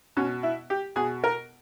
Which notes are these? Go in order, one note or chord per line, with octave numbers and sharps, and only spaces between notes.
B2 C#4
E4
G4
B2 G#4
A#4